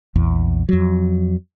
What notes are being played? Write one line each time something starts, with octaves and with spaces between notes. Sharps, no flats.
A#1 E2
F2 F#3